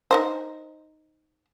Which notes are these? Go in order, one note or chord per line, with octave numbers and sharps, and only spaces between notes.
D#4 A#4 C5